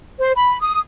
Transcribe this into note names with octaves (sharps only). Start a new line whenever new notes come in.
C5
B5
D#6